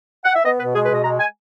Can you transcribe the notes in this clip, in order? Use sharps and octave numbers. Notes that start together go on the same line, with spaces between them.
F#5
E5
B3 D#5
B2 B4
G#3 G#4
B4
B2 D#5
G#3 A#5
G#5